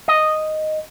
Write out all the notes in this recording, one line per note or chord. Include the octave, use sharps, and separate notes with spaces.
D#5